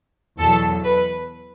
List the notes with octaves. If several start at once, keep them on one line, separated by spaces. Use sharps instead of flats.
E2 B2 F#3 A4
B4